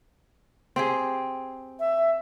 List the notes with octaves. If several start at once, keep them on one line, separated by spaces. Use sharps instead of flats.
C4 G4 G#4
E5